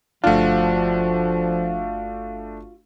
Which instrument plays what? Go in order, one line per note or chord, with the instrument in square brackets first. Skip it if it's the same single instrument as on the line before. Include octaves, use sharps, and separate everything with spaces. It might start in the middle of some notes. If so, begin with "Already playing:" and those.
[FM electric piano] G1 F5 [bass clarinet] F3 [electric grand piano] A3 D4 [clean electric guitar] F4 F#4